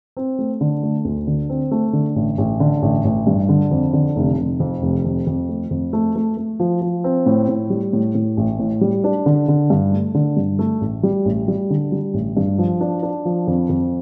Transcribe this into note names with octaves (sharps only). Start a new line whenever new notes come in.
C4
A3
D3
A3
D2
D3
C4
A3
D3
A1
A1
D3
A1
A1
G2
D3
F2
D3
F1
F1
F2
F1
F2
F2
A3
F2
A3
A3
A3
F3
F3
C4
A2
A2
G3
A2
A2
A1
A2
G3
D4
D3
D3
G2
A3
D3
G2
A3
A1
G3
A1
G3
D3
G3
A1
G2
F3
D4
D4
F3
F2
F2